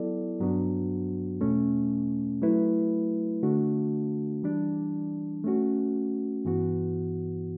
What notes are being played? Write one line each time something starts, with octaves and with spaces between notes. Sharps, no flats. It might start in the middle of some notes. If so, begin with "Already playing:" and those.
Already playing: F#3 B3 E4 A4 D5
G2 F#3 B3 D4 F#4
E2 B2 A3 C#4
F#3 A3 E4 B4
D3 A3 D4 F#4
E3 G3 D4
A3 C#4 F#4
G2 E3 B3 F#4